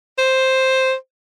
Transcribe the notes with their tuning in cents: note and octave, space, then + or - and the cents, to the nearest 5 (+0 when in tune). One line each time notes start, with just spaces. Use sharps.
C5 +5